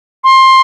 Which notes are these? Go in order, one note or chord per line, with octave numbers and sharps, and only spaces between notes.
C6